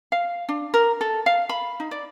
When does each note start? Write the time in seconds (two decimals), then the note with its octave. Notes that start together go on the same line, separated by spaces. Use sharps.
0.12 F5
0.49 D4
0.74 A#4
1.01 A4
1.26 F5
1.49 B5
1.80 D#4
1.91 D5